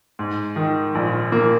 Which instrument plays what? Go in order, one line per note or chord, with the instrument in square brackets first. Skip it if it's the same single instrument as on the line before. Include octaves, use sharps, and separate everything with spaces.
[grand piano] G#2
D#3
A#1
A#3